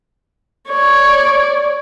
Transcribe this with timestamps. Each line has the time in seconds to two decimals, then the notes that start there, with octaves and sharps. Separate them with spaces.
0.69 C#5 D5